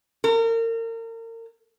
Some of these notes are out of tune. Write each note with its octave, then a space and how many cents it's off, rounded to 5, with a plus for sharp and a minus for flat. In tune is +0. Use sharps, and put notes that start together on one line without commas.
A#4 -35